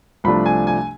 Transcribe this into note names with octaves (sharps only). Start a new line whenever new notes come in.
C2 C3 F3 A3 D4 B5
G#5
G#5